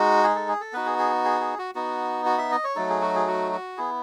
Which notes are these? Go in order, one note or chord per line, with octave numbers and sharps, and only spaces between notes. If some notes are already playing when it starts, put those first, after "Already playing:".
Already playing: G#3 D#4 F#4
G#4
A4
G#4
A4
B3 D#4 F#4 B4
G#4
G#4
G#4
G#4
F#4
B3 D#4 F#4
F#4
E5
D#5
C#5
F#3 A3 D#4 A4
G#4
F#4
G#4
F#4
F#4
B3 E4 G#4